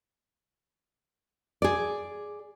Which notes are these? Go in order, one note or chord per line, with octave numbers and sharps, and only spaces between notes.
G#4 D5